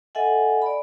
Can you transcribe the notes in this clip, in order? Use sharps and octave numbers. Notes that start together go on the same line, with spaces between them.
A4 D#5 E5 F#5 G#5
D5 B5